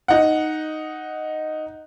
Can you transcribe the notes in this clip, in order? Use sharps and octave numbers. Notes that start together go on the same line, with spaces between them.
D#4 F#5